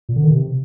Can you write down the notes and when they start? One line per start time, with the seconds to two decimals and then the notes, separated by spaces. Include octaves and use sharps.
0.09 A#2
0.16 D3
0.23 D#3
0.31 C3